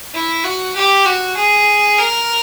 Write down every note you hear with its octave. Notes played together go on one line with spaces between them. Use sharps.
E4
F#4
G4
F#4
G#4
A#4